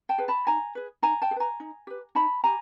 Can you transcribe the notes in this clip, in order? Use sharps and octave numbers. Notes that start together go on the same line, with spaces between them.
G5 A5
G#4 B4
A5 B5
D#4 G#5 A#5
G#4 B4
D#4 G#5 A#5
G5 A5
G#4
B4 G#5 A#5
D#4
G4 B4
D#4 A5 B5
G4 G#5 A#5